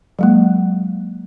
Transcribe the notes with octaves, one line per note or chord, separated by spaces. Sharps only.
F#3 G#3 A#3